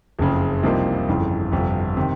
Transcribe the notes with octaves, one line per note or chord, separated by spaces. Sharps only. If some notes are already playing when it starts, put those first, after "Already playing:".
F#1 F2 C#3
C2 C3 F3 A#3 D#4
G1 F2 C#3 E3
G1 F2 C3
C3 D#3